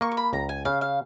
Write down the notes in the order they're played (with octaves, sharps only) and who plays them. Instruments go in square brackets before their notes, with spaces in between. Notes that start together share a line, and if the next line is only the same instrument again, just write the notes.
[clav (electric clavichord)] A#3 [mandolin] C#6
[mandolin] C#6
B5
[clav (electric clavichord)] C#2 [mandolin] A#5
[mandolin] G#5
[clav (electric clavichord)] C#3 [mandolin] F5
[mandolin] F5